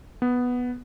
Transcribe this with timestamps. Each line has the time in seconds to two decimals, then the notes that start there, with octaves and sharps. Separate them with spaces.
0.22 B3